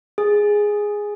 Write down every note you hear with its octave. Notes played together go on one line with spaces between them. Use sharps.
G#4